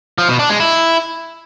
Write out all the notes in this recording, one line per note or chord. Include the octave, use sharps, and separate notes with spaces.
F3
B2
D4
G#3
E4